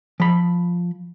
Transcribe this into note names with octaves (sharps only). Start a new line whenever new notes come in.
F3 B5